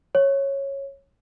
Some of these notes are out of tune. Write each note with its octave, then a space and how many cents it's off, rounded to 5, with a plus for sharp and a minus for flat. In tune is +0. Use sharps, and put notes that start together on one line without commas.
C#5 -10